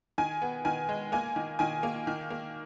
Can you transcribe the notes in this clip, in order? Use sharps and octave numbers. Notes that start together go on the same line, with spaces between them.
D#3 G#5
B3
D#3 G#5
G#3
A#3 G#5
D#3
D#3 G#5
A#3
D#3
A#3